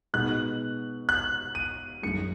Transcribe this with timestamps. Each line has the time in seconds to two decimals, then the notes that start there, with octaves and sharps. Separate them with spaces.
0.14 B2 G#3 B3 D#4 F#6
1.09 F#6
1.55 D#7
2.02 F#2 D#3 G#3 C#7